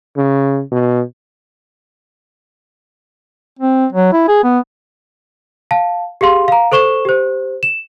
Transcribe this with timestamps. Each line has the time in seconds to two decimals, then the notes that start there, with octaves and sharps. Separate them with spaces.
0.16 C#3
0.72 B2
3.59 C4
3.93 F#3
4.13 E4
4.28 G#4
4.44 B3
5.71 F5 A5
6.21 G4 G#4 F5 C6
6.48 F5 A#5
6.72 A4 C5 C#6 E7 G7
7.05 G4 C5
7.63 E7